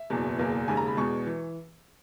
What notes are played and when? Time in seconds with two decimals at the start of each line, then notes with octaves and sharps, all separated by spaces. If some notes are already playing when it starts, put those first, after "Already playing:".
Already playing: E5
0.10 F#1 E2 B2
0.39 F#1 E2 B2 A#3
0.68 E1 D#2 C#3 G#5
0.77 A#5
0.87 B5
0.97 E2 B2 G#3 C#6
1.27 E3